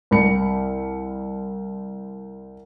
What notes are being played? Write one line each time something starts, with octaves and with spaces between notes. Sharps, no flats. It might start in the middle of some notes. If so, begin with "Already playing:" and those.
C2 B5 C#7